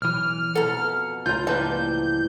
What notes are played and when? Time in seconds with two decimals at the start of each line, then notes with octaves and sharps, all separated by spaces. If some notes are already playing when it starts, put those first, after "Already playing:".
0.02 B1 E3 F6
0.55 F2 B2 A4 F#5 A#5
1.26 C#2 A2 F4 A#5 G6
1.47 E3 F3 G3 A#3 B4 A5